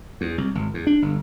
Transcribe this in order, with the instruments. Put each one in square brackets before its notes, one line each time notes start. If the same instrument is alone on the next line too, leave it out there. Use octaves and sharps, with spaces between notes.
[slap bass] E2
C2
G#1
E2
D4
G1